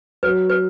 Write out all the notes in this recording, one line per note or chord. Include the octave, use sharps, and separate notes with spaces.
F#3 B4
B4